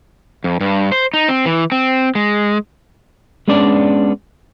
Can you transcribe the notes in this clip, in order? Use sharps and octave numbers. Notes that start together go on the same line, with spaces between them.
F2
G2
C5
D#4
C4
E3
C4
G#3
G#3 B3 C#4 D4 D5